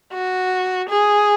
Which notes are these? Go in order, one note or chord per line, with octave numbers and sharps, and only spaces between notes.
F#4
G#4